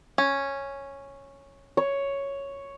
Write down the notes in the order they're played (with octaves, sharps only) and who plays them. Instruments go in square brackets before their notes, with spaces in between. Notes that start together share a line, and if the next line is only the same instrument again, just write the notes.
[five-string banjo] C#4
[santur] C#5